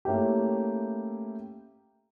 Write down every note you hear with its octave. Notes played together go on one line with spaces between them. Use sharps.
A3 A#3 C#4 E4 G4